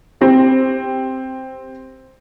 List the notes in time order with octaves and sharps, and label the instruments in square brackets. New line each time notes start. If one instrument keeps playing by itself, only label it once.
[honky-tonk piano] C4 G4